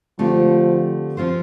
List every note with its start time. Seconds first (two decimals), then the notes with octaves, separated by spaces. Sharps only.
0.19 D3 F3 A3 C4 G4
1.17 F3 C4 F4 C5